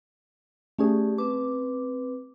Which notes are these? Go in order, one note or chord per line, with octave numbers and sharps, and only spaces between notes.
A3 C#4 G4 G#4 D5
C4 B4 D6